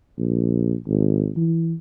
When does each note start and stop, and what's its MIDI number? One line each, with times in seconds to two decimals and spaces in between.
0.18 0.74 34
0.87 1.30 32
1.37 1.74 52